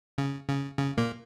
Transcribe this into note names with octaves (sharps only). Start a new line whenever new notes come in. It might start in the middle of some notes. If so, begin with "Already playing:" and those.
C#3
C#3
C#3
A#2 A#3